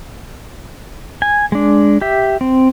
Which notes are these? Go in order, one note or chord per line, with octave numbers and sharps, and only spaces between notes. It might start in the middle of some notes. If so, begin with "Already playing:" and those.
G#5
G#3 D4
G4 E5
C4